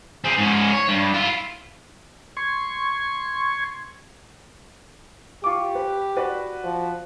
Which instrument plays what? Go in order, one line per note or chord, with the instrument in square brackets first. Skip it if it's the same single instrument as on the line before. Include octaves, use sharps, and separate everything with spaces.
[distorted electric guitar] C4 G#4
G#2 C#4
C#5
G2
E4 F4
[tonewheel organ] C6 C#6 G#6
[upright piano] F4 C#6 D6 [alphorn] G4
[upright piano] B4
F#4 B4 D5
[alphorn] F3